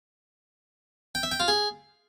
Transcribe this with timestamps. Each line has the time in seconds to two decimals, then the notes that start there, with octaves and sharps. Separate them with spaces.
1.15 G5
1.23 E5
1.31 G5
1.40 F4
1.48 G#4